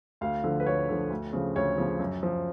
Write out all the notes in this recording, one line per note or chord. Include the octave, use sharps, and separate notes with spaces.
D2 F5
D3 F3
B4
D2 C#5
D3 F3
D2
C#3 F3
D2 C#5
C#3 F3
F#2
F3